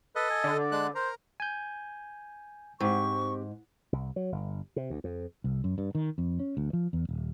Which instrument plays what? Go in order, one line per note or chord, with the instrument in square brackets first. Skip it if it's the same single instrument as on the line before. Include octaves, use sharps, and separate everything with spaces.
[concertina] A4 D#5 [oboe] B4
[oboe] G#5
[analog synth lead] D3
[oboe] D5
[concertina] G#3 D4 F#6
[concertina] A#4 A#5 [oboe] C5
[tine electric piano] G#5 G6
[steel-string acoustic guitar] G#2 [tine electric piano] C4 G4 [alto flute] C#6
[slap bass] C2
F#3
G1
C3
D2
F2
[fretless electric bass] C2
F#2
G2
D#3
F2
C#4
D2
F3
E2
D#1